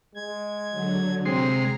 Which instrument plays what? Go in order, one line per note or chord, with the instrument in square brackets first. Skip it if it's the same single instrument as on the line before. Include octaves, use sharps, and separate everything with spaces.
[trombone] G#3 [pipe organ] G#6
[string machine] D3 F#3
[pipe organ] C3 [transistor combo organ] G#3 C6 [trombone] C4 [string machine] A#5